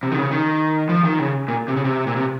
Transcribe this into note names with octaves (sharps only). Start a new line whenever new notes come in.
C3
D#3
C#3
D#3
F3
D#3
C#3
A#2
C3
C#3
C3
A#2
C3